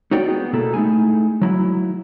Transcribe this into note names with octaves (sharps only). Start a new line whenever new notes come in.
D#4 F#4 C#5 D5 G5
B3 G#4
B2 A#3 E4 A4
A3 D#4 E4 G#4 G#5
F#3 E4